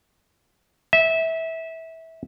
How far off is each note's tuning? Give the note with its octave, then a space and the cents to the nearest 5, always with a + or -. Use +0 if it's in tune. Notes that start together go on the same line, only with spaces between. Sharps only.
E5 -20